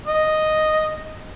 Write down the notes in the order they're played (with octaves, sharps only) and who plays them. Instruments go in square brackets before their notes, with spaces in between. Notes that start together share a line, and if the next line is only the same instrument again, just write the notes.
[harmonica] D#5